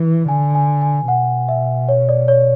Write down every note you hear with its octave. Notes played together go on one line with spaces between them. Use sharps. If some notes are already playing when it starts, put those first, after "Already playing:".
Already playing: E3
D3 G#5
G#5
G#5
B2 F#5
E5
C#5
D5
C#5